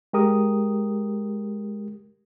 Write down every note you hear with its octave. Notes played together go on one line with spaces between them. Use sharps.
G#3 G4 A#4 D#6